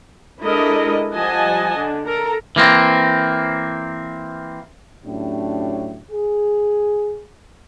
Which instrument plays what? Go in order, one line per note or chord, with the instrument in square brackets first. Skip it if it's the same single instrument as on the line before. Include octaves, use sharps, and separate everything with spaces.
[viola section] G#3 D4 E4 A4 A#4 D#5
F3 G3 D#5 F#5 G#5 A5
D3 D4
A4 A#4 A#5
[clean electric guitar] E3 A#3 C4
[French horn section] A2 F#3 C#4 D4 G4
G#4